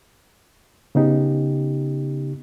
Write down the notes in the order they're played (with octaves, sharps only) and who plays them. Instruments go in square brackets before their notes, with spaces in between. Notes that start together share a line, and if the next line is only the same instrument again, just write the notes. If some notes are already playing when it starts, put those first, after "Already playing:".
[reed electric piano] C#3 B3 D#4 G4